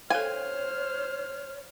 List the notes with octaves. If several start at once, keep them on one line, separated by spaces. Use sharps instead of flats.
A4 C5 C#5 F5 G#5 F6